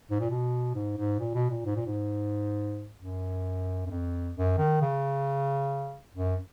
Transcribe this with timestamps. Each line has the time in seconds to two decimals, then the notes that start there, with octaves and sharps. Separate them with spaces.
0.11 G#2
0.20 A#2
0.30 B2
0.75 G#2
0.97 G#2
1.20 A#2
1.34 B2
1.50 A#2
1.65 G#2
1.76 A#2
1.86 G#2
3.00 F#2
3.86 F#2
3.90 F2
4.36 F#2
4.58 D#3
4.81 C#3
6.15 F#2